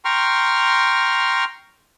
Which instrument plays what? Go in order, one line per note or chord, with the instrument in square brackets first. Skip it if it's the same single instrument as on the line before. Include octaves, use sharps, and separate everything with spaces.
[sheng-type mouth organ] G5 A#5 C6 C#6 F6